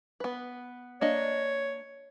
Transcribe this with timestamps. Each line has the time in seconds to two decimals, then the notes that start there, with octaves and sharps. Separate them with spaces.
0.20 B3 B4
1.01 A#3 D4 C#5 D#5